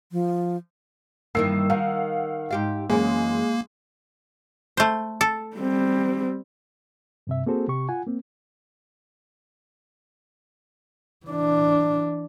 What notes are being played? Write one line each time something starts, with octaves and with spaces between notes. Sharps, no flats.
F3
G2 D#3 E3 A#3 E6 C7
D#3 F5 F#5
G#2 G4 F5
F#2 E3 G#3 A#3 C#4 G#4
A3 C5
A4
G3 C4
G2 C3 E5
A#3 C4 F#4 G#4 A4 C5
C3 G4 C#6
F4 F#5 G#5
A#3 C4
E3 D4